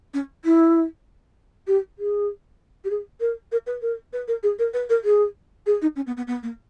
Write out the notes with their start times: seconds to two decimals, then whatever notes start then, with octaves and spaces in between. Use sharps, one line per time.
0.14 C#4
0.45 E4
1.67 G4
1.98 G#4
2.84 G4
2.90 G#4
3.20 A#4
3.52 A#4
3.66 B4
3.82 A#4
4.13 B4
4.28 A#4
4.43 G#4
4.59 A#4
4.73 B4
4.89 A#4
5.04 G#4
5.66 G#4
5.81 D#4
5.96 C#4
6.07 B3
6.17 B3
6.27 B3
6.43 A#3